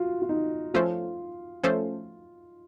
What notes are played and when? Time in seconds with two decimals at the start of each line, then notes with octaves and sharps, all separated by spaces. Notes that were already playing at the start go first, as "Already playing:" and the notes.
Already playing: F4 F#4
0.22 F4
0.29 D#4
0.74 F3 A3 C#4 F4 A4 C5
1.64 F3 A3 C#4 A4 C5